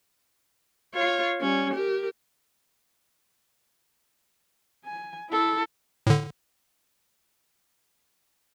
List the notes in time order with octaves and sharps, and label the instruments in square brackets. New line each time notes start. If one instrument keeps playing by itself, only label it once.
[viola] F4 C#5
G3 C#4
G4 A#4
[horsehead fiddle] G#5
E4 A4
[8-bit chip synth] A2 D3